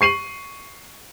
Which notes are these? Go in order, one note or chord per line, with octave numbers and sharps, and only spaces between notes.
C#6 C7 D#7 F#7